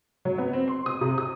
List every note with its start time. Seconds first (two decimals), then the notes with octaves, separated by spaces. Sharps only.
0.25 F#3
0.38 B3
0.53 C4
0.68 C6
0.86 D#6
1.01 C3
1.18 D#6